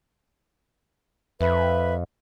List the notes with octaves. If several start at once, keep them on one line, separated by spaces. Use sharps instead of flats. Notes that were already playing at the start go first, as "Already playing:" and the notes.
F2 B4 E5